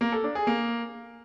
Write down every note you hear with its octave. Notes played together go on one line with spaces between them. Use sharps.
A#3
A4
D4
G#4
A#3